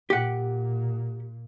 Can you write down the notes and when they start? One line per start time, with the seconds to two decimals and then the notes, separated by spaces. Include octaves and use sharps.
0.10 A#2 G4 F#5